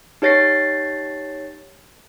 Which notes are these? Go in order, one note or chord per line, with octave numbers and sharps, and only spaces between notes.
D#4 G4 C#5 A6 A#6 C7